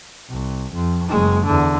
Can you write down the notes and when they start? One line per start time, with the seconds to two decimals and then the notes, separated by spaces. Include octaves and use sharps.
0.29 C2
0.72 F2
1.08 F#1 G#3
1.45 E2 D3